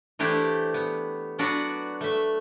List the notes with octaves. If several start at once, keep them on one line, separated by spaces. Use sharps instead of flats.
E3 A3 D4 E4 G4 C5
B3
F#3 B3 D4 F#4 B4 F#5
A3 E5